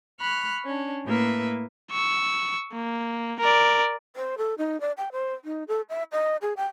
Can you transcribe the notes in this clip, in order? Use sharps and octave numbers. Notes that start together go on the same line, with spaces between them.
B5 C#6 F6 F#6
C#4 D4
A2 A#3 B4 E5
C#6 E6
A#3
A#4 D5
C5
A4
D#4
D5
G5
C5
D#4
A4
E5
D#5
G#4
G5